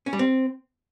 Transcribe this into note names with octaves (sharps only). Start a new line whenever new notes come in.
C#4
G3
C4